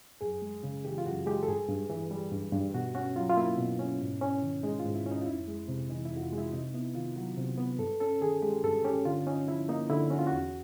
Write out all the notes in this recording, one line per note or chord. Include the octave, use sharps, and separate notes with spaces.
F#2 G#4
G#3
C#3
E3 G4
F4
F#2 F#4
G#3 G4
A4
G2 G#4
G2
E3
G3
G2
G2
B2 F#4
C#4 F#4
F#3 F4
F4
A#3 E4
B2
C#4
G#2
C#4
D#3
G#3 D#4
F4
G#2
E4
C#4
D#4
F4
F2 E4
G#3
C3
E3 D#4
E4
F2
F#4
F4
G#3
E4
C3 D#4
B3 E4
D#3 F4
F#3 F#4
C3
B3
G2 A4
C#4 A4
D#3 G#4
G#3 G4
G2 A4
C#4 G4
D3 F4
C#4 D#4
F3 E4
A#3 D#4
D3 E4
C#4 F#4
F4
F#4
E2